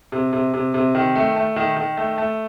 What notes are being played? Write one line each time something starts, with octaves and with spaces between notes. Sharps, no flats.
C3
C3
C3
C3
D#3
A3
A3
D#3
D#3
A3
A3